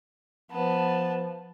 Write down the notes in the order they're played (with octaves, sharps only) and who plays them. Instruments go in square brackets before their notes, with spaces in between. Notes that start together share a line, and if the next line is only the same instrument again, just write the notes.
[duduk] F3 [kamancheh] B3 A5